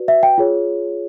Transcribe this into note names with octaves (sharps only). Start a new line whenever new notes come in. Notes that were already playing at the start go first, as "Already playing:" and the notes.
Already playing: F#4 B4 D5
E5
G5
F4 G#4 C#5